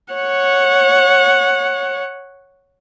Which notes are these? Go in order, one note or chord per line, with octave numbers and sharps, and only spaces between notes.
C#5 F#5